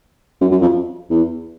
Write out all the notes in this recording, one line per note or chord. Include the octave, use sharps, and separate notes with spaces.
F#2
F#2
F2
E2